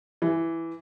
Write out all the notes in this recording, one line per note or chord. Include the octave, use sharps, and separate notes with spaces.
E3